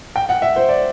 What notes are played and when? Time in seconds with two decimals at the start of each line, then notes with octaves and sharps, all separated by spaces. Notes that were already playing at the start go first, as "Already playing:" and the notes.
0.16 G5
0.29 F#5
0.42 E5
0.56 C5
0.69 D5